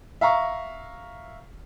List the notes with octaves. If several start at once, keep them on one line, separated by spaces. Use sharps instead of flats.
E5 F5 A#5 C#6